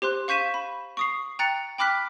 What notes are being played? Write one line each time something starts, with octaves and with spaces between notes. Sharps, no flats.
G4 C5 C6 F#6
F5 C#6 G6 B6 D#7 E7
B5
C#6 D#6 C7
G5 A#5 F#6 A6 C#7
G5 B5 D6 F6 F#6 B6